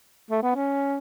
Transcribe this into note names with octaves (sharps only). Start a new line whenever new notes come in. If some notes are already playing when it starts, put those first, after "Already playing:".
A3
B3
C#4